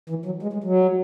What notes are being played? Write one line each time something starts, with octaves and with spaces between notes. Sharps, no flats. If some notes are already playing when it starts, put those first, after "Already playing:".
E3
F#3
G#3
G#3
F#3